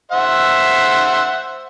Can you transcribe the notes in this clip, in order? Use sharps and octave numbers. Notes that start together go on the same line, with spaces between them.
C5 E5 F#5